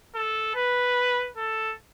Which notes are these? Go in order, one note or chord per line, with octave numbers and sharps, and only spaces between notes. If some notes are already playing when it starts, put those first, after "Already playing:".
A4
B4
A4